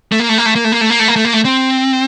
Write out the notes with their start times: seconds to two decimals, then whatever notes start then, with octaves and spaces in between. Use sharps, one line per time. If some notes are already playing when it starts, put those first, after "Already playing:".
0.12 A3
0.20 A#3
0.29 A3
0.38 A#3
0.46 A3
0.55 A#3
0.64 A3
0.72 A#3
0.81 A3
0.90 A#3
0.99 A3
1.08 A#3
1.16 A3
1.25 A#3
1.33 A3
1.45 C4